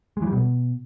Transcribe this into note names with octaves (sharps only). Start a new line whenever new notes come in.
G#3
E3
G3
B2